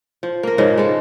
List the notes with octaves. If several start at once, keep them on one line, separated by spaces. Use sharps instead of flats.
F3
A#3 A#4
G#2 C#3 F3 D#5
G#3 A4